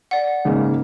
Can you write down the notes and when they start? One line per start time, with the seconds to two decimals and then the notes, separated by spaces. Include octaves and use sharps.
0.11 D5 F#5
0.45 G#2 C#3 A#3